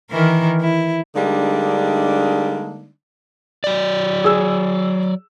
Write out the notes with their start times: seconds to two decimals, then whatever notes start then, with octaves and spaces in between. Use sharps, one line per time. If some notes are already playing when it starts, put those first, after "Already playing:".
0.11 D#3 E3 A#4
0.60 E4
1.15 D3 G3 G#3 A#3 D4 D#4
3.64 F#3 D5
4.24 G#4 E6